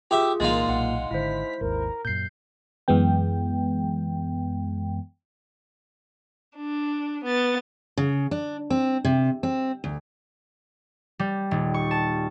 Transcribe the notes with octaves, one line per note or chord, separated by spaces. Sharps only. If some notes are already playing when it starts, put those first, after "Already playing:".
F4 G4 G#4 E5
C2 A#2 E3 G#3 D#4 F4 A6
B1 F#5 C6
G#1 D3 E4 C5 B6
G#1 D#2 A#4
F#2 A#2 G6 C7
F#2 E3 G#3 B3 G5
D4
B3 A6
C#3
D4
C4
C3
C4
D2
G3
D#1
C#6
A5